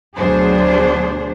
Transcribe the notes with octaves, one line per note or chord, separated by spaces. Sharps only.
D2 B2 F#3 D4 G#4 C5